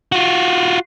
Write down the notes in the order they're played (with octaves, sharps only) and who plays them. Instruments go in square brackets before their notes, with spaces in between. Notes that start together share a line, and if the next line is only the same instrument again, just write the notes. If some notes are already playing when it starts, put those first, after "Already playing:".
[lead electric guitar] F4 F#4